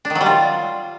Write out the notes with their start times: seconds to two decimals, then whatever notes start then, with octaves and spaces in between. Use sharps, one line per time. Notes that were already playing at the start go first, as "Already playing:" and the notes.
0.05 D4
0.10 D#3
0.15 F#3
0.21 G3
0.26 F4